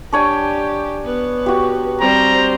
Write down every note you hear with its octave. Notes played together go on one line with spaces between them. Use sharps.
D4 G4 C#5 G#5
B3 B4
F#4 G4
G3 C4 C5 A#5